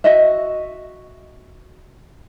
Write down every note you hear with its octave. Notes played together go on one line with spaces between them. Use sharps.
F#4 D#5 E5